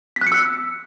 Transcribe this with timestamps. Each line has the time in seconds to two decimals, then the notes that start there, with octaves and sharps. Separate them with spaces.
0.16 B6
0.21 F#6
0.27 C#7
0.32 E6